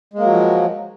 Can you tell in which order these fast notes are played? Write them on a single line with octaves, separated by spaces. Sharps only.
G#3 A#3 F#3 F3